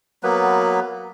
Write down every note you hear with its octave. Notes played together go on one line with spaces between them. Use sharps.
F#3 A#3 B3 B4